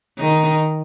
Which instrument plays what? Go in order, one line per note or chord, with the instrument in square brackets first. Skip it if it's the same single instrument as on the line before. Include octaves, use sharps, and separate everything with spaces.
[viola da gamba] D#3 D#4